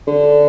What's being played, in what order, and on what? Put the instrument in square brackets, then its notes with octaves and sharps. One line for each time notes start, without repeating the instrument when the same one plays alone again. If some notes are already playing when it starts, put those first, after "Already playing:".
[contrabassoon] D3